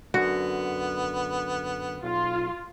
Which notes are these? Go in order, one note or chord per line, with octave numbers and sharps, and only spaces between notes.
F#2 D3 B3 F#4
B1 F4 F5